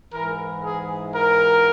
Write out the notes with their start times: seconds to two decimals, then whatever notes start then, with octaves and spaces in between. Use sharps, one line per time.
0.13 G#2 E3 A#4
0.63 G#4
1.13 A#4